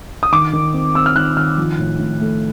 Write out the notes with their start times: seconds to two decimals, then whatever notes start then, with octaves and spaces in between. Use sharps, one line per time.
0.23 D#6
0.32 D#3 D6
0.53 D#3
0.74 C4
0.95 C4 E6
1.06 F6
1.16 D#3 F#6
1.37 D#3 F6
1.58 F3
1.79 A2
1.99 A2
2.21 A3